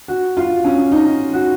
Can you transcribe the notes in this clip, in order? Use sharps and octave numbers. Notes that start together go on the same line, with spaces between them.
F#4
F4
C#4
D#4
F#4